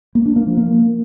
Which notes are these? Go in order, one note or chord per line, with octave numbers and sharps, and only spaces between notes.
A#3
D4
A#3
F3
A#3